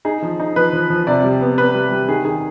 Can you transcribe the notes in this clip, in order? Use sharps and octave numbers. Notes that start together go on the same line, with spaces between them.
D#4 G#4
F3
D#4
F3 B4
F3
F3
C3 D5
G3
B3
B3 B4
G3
G3
D#3 G#4
D#3 G#4